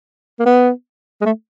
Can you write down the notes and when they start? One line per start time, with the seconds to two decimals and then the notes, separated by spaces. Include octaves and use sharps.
0.40 A#3
0.46 B3
1.21 G#3
1.25 A3